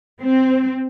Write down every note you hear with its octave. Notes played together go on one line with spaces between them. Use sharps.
C4